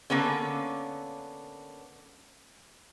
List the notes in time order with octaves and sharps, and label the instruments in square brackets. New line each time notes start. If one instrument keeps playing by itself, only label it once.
[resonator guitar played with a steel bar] D3 A#3 B3 C#4